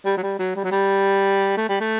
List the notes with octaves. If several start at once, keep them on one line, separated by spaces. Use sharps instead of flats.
G3
F#3
G3
F#3
G3
F#3
G3
A3
G3
A3